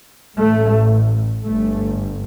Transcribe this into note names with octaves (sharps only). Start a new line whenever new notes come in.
A1 A2 A3
G1 G2 A3